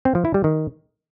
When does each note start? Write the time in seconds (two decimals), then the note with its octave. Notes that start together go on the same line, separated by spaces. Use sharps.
0.05 C4
0.15 F3
0.25 E4
0.34 G3
0.44 D#3